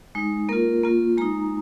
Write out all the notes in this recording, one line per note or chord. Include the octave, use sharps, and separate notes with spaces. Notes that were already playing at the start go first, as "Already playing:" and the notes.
G#3 D#4
A#3 F4 A#4
A#3 F4
G#3 D#4 A#5